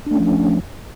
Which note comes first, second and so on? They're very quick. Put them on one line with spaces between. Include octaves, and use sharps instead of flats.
D4 A3 C#4 F3